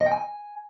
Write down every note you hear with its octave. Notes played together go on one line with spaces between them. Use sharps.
D#5
G5
G#5